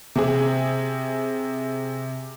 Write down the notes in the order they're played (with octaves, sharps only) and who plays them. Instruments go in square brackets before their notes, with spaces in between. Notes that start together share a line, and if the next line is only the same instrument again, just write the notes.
[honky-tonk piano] C3 G#4